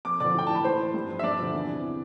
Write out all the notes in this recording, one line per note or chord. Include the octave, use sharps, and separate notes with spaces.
F2 D6
D3 F3 D5 D6
A2 G5
E3 A5
B5
A2 C5 C6
E3
G2
F3
E5
G2 D4 D5
D3 F3
E2
C3 E3